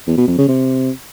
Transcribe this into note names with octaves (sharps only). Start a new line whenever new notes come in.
E2
B2
F2
C#3
C3